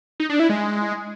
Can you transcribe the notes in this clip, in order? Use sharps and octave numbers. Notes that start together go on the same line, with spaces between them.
D#4
D4
E4
G#3